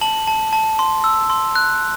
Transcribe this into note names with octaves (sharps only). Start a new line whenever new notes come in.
A5 F#7
A5
A5
C6
E6
C6
F#6